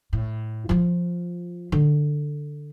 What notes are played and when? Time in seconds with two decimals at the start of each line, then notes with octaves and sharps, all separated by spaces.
0.13 A2
0.69 F3 F4
1.72 D3